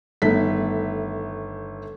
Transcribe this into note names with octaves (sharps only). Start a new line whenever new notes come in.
G1 D#3 A3 B6